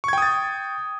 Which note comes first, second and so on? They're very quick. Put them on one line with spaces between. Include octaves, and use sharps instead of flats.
C#6 G#6 G5 D#6 A6